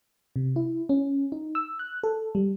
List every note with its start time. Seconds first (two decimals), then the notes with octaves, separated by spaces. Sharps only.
0.36 C3
0.56 E4
0.89 C#4
1.32 D#4
1.55 E6
1.79 F#6
2.03 A4
2.35 G3